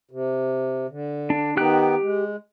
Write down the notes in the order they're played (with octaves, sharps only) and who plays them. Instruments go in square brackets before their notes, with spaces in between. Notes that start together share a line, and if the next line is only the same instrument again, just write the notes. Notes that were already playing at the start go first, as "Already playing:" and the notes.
[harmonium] C3
D3
[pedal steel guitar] D4
[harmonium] D#3 B3 D#4 [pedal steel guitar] G4 G5 F#6
[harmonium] G#3